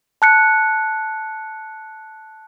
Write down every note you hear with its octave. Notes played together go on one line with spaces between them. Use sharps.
A5 F#6 C#7